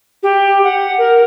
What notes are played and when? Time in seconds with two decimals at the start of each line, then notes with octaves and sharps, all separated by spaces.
0.23 G4
0.64 F#5
0.98 A#4